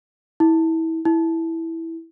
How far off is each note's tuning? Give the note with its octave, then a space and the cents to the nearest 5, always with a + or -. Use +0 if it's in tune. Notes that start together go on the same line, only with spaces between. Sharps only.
E4 -25
E4 -5